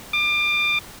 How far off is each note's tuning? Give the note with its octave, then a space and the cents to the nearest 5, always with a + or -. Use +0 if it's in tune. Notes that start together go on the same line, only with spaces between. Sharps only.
D6 +30